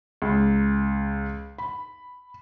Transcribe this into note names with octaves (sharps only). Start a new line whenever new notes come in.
C#2
B5